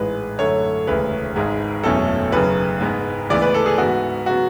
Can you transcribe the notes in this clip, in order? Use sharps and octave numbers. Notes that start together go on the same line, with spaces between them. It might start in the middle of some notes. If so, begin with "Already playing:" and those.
Already playing: A1 G#2 G#3 B4
F#2 D3 A3 C#5
E1 D2 C#3 B4
G#1 G#2 G#3
F#1 E2 B2 A3 C#4 A4
F#1 F#2 C#3 B4
G#2 G#3 B3
D2 C#3 E3 G#3 B3 D5
B4
A4
G#4
G#2 E3 B3 F#4
C#3 F#3 B3 F#4